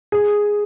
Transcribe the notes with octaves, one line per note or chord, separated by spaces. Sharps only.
G#4